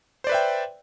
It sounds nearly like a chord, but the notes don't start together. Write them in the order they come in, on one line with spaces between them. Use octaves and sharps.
C5 D5 B4 E5 G5